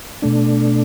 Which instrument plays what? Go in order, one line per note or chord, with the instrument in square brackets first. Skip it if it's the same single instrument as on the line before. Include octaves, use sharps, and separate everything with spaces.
[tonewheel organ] B2 A3 D4